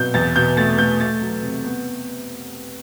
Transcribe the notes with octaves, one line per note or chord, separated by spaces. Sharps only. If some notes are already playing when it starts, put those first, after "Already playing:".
Already playing: B2 F#3 G6
E2 A6
B2 G6
A3 A6
A3 G6
A3 A6
F#3
C3
B3